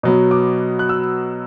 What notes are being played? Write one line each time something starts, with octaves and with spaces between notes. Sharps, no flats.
B2 F#3 B3
D6
F#6
E6